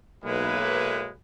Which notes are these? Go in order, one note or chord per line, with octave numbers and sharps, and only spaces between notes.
B1 G#3 A#3 E4 B4